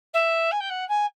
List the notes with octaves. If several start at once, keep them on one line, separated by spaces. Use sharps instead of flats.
E5
G#5
G5
F#5
G#5